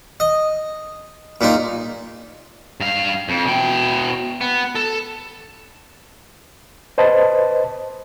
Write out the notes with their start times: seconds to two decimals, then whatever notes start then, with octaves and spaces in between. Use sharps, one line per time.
0.20 D#5
1.41 A#2 A#3 D#4 F4
2.80 G2 F5
3.29 F2
3.45 B2 G5
4.41 B3
4.75 A4
6.98 B4 C5 D#5 A5